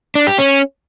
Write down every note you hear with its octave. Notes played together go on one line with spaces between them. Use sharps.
D4
G4
C#4